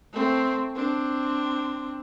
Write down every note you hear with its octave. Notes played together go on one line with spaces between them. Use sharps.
A3 C4
C4 D4